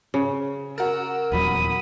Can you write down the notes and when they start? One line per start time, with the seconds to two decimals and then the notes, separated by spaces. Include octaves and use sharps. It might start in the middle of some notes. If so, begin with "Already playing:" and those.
0.14 C#3
0.78 F#4 A#4 E6
1.32 D#1 E2 F#3 B5 D#6